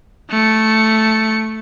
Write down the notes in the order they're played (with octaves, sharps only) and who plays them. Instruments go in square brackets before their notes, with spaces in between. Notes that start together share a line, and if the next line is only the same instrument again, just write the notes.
[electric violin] A3 C#7